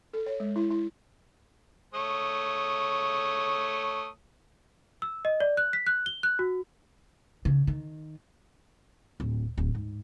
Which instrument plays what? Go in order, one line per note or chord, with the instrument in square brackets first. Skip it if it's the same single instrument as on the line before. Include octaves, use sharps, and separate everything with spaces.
[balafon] A4
C#5
G#3
E4
E4
[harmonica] A3 C#5 D#6
[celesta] E6
D#5
D5
F#6
B6
F#6
G7
F#6
F#4
[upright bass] C#3
D#3
D1
D1
G#2